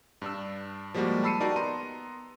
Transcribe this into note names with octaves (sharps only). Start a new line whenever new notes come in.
G2 D4 E6
F3 G3 G#3 A#3 F#4 G4
A5 B5 E6 C7 C#7 D#7
D#4 F#4 G4 A#4 D5 A5
B3 A#5 C6 D#7